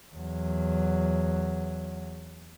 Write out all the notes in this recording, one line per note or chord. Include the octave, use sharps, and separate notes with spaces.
E2 F#3